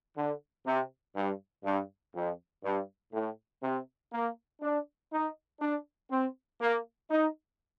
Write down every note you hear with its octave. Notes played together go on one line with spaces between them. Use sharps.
D3
C3
G2
G2
F2
G2
A2
C3
A#3
D4
D#4
D4
C4
A#3
D#4